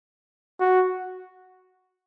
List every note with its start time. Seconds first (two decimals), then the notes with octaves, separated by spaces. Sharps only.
0.60 F#4